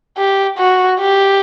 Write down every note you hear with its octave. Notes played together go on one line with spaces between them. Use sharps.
G4
F#4
G4